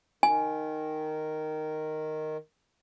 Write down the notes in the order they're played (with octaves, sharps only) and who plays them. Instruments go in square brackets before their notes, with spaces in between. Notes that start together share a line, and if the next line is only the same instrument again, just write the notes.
[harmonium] D#3 [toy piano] G#5